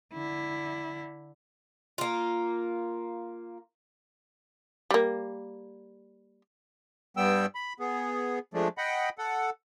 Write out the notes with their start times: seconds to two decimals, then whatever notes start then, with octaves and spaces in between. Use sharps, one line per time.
0.13 D3 E4
1.98 A#3 F4
4.91 G3 A#3
7.17 G2 G3 B3 G5 E6
7.55 B5
7.80 B3 G#4
8.54 F3 G#3 A3 D4
8.78 D#5 F#5 G5 B5
9.18 A4 F#5